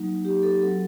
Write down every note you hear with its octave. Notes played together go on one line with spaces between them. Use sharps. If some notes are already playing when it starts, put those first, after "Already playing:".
Already playing: F#3 A#3 D#4
G4
A4
F#3 C4 F#4 A4